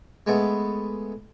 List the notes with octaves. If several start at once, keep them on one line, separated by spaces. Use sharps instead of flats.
G#3 A3 B3